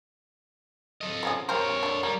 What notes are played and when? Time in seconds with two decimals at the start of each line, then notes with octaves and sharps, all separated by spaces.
1.01 A4 D#5
1.23 F3 C#4 G#4
1.49 G3 A#3 A#4 C5 C#5
1.83 D4 A4
2.03 G3 A#3